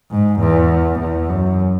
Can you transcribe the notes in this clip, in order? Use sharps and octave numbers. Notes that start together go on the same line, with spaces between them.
G#2
E2
E2
F#2